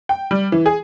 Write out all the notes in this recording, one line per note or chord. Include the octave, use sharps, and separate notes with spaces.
G5
G3
E3
G#4